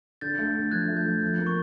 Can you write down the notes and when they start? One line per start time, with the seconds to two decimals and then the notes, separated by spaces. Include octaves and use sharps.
0.21 D3 G6 A6
0.38 A3
0.55 D3
0.71 F3 F#6 G#6
0.88 A3
0.97 G6
1.05 F3
1.22 F3
1.39 A#3
1.47 C#6